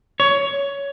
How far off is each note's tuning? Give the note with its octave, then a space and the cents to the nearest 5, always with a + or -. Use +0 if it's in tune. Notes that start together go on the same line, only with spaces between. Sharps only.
C#5 +15